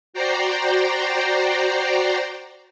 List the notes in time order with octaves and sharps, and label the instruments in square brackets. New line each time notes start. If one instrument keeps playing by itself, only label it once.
[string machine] F#4 C5 D5 G5 A#5 C6